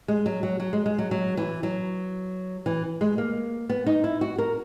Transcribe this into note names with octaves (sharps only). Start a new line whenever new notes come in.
G#3
F#3
F#3
F#3
G#3
G#3
F#3
F#3
E3
F#3
E3
G#3
A#3
B3
D#4
E4
F#4
A#4